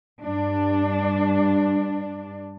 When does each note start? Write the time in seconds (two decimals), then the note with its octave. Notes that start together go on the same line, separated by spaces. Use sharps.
0.23 G2 D4